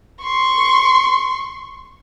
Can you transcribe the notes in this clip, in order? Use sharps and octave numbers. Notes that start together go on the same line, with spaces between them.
C6 C#6